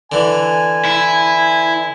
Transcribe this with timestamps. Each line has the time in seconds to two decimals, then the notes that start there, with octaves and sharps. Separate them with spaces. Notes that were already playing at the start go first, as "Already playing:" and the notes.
0.12 D3 E3 G#5
0.85 E4